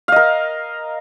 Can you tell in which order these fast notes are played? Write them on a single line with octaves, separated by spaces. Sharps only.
F5 D#5 A#4